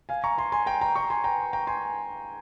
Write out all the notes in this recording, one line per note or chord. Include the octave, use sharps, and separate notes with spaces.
F5 G#5
A#5 C#6
G#5 C6
G#5 C6
G5 A#5
G5 A#5
A#5 C#6
G#5 C6
G5 A#5
G5 A#5
G#5 C6